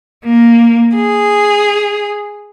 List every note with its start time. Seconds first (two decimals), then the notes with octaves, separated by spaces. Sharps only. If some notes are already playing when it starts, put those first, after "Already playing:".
0.23 A#3
0.96 G#4